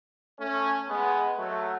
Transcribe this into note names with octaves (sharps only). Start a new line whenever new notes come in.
A3 C#4
G#3 B3
F#3 A3